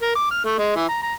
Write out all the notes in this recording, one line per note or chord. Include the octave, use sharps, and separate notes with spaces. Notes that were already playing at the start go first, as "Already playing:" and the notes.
A#4
D6
F6
A3
G#3
E3
A#5
A#5